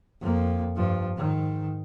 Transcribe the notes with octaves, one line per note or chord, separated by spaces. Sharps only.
F2 A#3
G2 F3
G#2 D#3